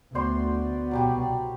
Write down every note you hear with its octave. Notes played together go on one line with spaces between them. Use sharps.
D2 B3 F#4 C5 D5 C6
C2 B2 F#3 G3 G4